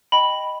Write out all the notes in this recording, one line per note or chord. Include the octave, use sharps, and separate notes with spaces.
D#5 G5 B5